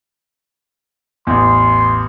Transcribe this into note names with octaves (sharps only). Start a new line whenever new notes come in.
A1 E2 C6